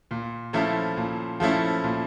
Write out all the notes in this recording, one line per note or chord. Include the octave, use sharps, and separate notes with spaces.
A#2
F3 A3 C#4 E4
A#2
F3 A3 C#4 E4
A#2